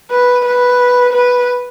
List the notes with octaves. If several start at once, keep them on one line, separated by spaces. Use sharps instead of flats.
B4
B4
B4